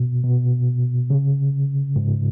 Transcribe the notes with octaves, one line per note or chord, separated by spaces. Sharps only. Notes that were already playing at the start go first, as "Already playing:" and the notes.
Already playing: B2
B2
C#3
G#2